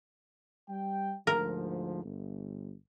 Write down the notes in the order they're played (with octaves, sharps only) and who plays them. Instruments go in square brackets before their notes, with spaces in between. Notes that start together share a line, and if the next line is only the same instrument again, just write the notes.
[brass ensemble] G3 G5
[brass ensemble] D2 G#2 F3 [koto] A#4
[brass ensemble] G1